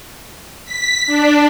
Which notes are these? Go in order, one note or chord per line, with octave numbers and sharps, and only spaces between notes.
B6
D4